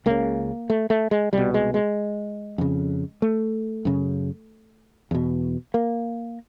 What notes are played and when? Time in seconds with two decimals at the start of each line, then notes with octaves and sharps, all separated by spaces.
0.06 C#2 C#3 A#3
0.70 A3
0.90 A3
1.11 G#3
1.33 C2 B2 G3
1.54 G#3
1.74 G#3
2.58 F2 C#3
3.22 A3
3.85 F#2 C#3
5.11 E2 B2
5.74 A#3